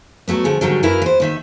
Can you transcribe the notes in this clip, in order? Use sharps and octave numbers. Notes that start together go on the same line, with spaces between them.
F#3 G#3 A3 B3
D3 F3 G#4
G#2 D3 D#3 F#3 G3
F#2 A#3 E4 A#4 B4 F5
E3 C5
D#2 D#3 E5